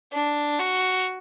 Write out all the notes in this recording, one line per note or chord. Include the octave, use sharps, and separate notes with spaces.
D4
F#4